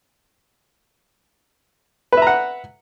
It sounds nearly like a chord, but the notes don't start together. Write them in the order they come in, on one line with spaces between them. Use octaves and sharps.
B4 E5 A#5 F#5